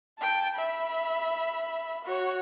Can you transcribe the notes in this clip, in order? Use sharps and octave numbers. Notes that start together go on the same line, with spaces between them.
G5 A5
E5 B5
F#4 C#5